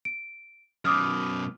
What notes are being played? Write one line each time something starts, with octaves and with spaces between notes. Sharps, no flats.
D7
F#2 B2 D6 D#6 F6